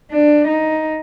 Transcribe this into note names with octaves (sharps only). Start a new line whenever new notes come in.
D4
D#4